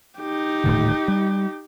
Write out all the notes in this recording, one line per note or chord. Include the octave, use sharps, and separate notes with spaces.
D#4 G4
D#1 A2 D3
G3